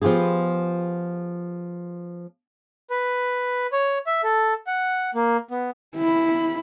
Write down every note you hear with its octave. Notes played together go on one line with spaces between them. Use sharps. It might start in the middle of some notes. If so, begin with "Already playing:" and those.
F3 B3 F4 G4 G#4
B4
C#5
E5
A4
F#5
A#3
B3
E4 B5